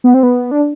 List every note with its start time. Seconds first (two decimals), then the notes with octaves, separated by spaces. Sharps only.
0.04 B3
0.14 C4
0.23 B3
0.51 D4